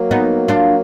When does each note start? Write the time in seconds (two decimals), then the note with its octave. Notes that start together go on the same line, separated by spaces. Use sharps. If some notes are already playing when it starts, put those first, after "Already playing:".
Already playing: F#3 A#3
0.11 B3 D#4
0.48 D4 F4